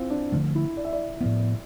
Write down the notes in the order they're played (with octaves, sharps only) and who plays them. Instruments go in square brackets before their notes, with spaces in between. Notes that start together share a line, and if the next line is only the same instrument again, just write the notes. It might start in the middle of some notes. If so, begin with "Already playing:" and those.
Already playing: [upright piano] C4 E4 F4
D4
[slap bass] D3 F3 A3 D4
[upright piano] E4
D5
E5
D5
[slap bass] A2 F3 B3